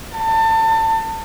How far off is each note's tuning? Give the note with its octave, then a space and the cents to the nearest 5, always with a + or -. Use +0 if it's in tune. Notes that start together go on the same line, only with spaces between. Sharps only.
A5 +30